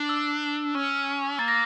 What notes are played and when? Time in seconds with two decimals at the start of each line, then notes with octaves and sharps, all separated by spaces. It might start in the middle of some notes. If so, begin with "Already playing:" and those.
Already playing: D4
0.09 E6
0.75 C#4
1.39 A#3 A6
1.48 A#6